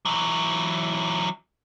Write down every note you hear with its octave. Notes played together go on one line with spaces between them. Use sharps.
E3 F#3